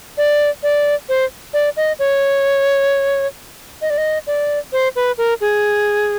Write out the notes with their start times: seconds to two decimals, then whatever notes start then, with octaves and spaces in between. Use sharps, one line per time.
0.18 D5
0.63 D5
1.09 C5
1.54 D5
1.77 D#5
1.99 C#5
3.82 D#5
3.90 D5
3.98 D#5
4.27 D5
4.72 C5
4.96 B4
5.18 A#4
5.41 G#4